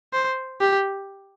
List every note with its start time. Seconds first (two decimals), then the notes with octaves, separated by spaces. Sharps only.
0.13 C5
0.61 G4